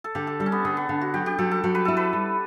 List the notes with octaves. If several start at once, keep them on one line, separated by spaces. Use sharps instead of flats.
A4
D3 G4
A4
G3 A4
C#4
B3
D3 B3
B3
D3
F#4
F#3 G4
G4
F#3 A4
A4
F#3
B4
E4 A4
B4
G3